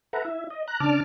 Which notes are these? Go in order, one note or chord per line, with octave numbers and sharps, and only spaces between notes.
A4 B4 E5 F#5 A#5
E4 E5
D#5
A#5 F#6
C#3 D4 A5 D6 F6